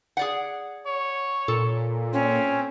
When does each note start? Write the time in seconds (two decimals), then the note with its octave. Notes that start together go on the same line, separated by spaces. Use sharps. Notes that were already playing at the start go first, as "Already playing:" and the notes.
0.17 G#4 D5 F#5
0.86 C#5
1.48 A#2 A4
2.13 C4 C#4